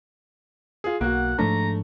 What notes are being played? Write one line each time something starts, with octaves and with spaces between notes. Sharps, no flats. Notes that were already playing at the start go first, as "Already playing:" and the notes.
F4 G#4
B1 A#3 F#4 F#5
G#2 F3 A3 D4 A#5